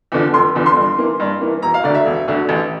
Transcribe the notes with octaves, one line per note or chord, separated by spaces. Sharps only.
E2 D3 F3
F1 C6
E2 D3 F3
C6
G2
E3 A#3
G2
E3 A#3
E1 A#5
F5
D2 D3 D5
E5
E1
D2 D3
A1